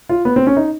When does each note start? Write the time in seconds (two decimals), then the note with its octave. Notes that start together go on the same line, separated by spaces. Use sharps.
0.09 F4
0.25 B3
0.36 C4
0.47 C#4
0.57 D#4